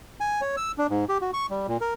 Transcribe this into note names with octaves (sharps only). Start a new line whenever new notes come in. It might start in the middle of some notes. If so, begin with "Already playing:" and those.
G#5
C#5
E6
D4
G#2
G4
F#4
C#6
G3
A#2
A#4